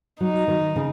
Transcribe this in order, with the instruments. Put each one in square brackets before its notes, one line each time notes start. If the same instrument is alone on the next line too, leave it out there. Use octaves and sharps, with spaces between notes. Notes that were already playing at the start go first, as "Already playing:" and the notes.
[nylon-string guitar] F#3 [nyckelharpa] D#4
[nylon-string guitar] D#3
C#3